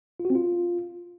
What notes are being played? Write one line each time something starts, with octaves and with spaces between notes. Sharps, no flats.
F4
F#4
C4
F4